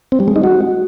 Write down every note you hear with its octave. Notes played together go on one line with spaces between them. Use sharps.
C4
G3
G#3
D#4
F#4